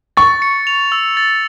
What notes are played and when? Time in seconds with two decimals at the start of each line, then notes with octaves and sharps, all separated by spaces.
0.17 C#6 A6
0.42 C#7
0.67 F7
0.92 E6
1.17 A6